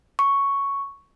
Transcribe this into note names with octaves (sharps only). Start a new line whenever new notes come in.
C#6